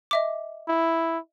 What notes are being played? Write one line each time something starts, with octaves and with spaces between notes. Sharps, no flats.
D#5 E5 D6
E4